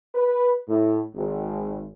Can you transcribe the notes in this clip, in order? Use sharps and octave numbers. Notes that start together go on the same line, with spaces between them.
B4
A2
G#1